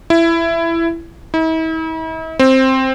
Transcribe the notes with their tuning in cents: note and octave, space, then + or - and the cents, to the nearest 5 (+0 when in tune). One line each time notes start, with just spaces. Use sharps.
E4 +15
E4 -45
C4 +10